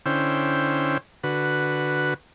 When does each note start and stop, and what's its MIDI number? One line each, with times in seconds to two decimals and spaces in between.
0.06 0.97 50
0.06 0.97 61
0.06 0.97 64
0.06 0.97 72
0.06 0.97 79
1.24 2.14 50
1.24 2.14 66
1.24 2.14 71